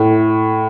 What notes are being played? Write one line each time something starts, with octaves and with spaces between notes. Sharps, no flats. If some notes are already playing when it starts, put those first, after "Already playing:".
Already playing: A2